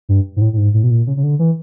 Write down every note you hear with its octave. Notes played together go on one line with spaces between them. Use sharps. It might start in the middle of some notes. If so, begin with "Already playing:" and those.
G2
G#2
A2
A2
G#2
A2
B2
A#2
C#3
C#3
D3
E3